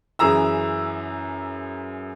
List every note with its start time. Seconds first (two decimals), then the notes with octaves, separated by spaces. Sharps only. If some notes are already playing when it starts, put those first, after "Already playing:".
0.19 F#2 E3 G#4 A#5 E6